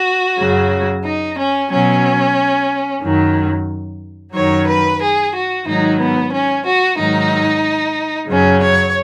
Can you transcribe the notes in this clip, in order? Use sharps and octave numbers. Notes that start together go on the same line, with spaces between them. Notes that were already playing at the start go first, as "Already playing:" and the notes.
Already playing: F#4
F#2 C#3 F#3
D#4
C#4
B2 F#3 C#4
F#2 D#3 F#3
F#2 D#3 F#3 C#5
B4
G#4
F#4
G#2 D#3 F#3 D#4
B3
C#4
F#4
G#2 D#3 F#3 D#4
F#2 C#3 F#3 C#4
C#5